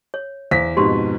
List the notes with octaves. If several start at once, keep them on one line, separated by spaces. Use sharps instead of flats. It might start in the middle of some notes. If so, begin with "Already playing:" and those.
C#5
E2 C5 F5 B6
F2 G#2 B2 G4 C6